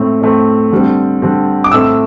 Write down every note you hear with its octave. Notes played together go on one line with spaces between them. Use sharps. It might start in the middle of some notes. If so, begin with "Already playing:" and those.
Already playing: A2 A3 C4
A2 A3 C4
D3 G3 C4
D3 G3 C4
D6
A2 A3 C4 E6